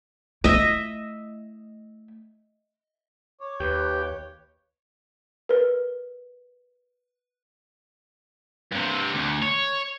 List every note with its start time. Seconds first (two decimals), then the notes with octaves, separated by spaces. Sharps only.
0.44 A3 E4 D#5 E5
3.40 C#5 D6
3.60 D#2 G4 B4
5.49 A#4 B4
8.72 G2 C3
9.14 D2
9.42 C#5